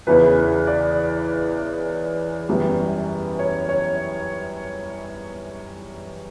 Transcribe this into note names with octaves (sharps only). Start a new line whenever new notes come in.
E2 C#3 E3 B3 B4
D5
F#2 E3 G3 B3
C#5
C#5